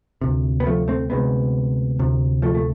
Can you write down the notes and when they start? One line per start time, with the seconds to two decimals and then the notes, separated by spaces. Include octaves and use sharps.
0.21 D2 C3
0.60 B3
0.66 F3 A3
0.88 A3 C4
1.10 D2 C3 G#3 B3
1.99 D2 C3
2.42 F3 A3
2.55 A3